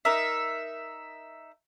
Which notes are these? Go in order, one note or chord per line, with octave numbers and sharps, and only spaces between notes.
D#4 A#4 E5